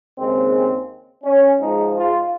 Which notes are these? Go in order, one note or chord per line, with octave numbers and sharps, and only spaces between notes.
D#2 C#3 G#3 C4
C#4
G#2 F3 G#3 D#4
F4